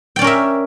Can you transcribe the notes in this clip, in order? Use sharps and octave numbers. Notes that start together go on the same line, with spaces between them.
C#4 A#4 D5 E5 G5